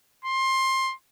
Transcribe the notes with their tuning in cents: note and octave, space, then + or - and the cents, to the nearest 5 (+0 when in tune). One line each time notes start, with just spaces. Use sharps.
C6 +20